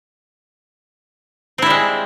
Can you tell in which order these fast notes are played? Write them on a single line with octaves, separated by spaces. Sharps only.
C4 E4 G3 G#3